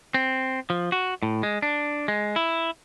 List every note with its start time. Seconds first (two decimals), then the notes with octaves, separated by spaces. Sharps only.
0.14 C4
0.70 F3
0.92 F#4
1.23 A2
1.43 G#3
1.62 D4
2.08 G#3
2.36 E4